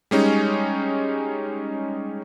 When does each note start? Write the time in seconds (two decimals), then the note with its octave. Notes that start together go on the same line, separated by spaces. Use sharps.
0.11 G3 G#3 C#4 D#4